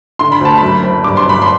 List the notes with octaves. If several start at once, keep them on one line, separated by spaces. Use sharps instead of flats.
D3 C6
B5
D2 A5
F#2 B5
F#1
G2 D6
C6
G1 B5
C6